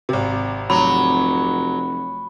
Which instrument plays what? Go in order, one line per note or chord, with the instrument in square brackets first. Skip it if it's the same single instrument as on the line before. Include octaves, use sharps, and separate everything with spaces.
[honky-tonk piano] G#1 C3
[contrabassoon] F1 [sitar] F#3 [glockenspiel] B5